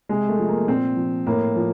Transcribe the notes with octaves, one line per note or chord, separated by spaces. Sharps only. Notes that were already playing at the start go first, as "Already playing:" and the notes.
C3 G#3
A3
F3
A#3
A#2 C4
F3
A2 A#3
F3